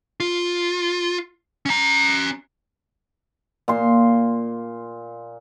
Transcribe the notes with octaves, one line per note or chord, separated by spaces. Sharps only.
F4
C#4 A#5
A#2 C6